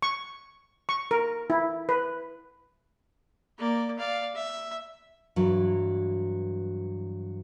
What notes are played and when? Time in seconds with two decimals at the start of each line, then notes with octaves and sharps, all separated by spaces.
0.02 C#6
0.89 C#6
1.11 A#4
1.50 E4
1.89 B4
3.58 A#3 D5
3.98 D5 F5
4.35 E5
5.36 G2 E3 F#3